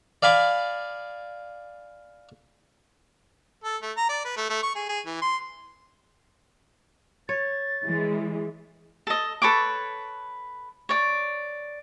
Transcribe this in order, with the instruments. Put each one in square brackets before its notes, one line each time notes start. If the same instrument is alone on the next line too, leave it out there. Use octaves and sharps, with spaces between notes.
[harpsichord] D5 F5 G#5 B5 D6
[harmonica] A4
A3
A#5
D5
B4
A3
A3
C#6
G#4
G#4
E3
C6
[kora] C#5 [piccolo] A6
[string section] E3 G#3
[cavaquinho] A4 D#5
A4 B4 C#5 D6
C#5 D5